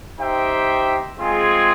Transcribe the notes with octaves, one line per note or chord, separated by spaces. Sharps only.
D#4 G4 C5 E5 G5
G#3 C4 F4 G#4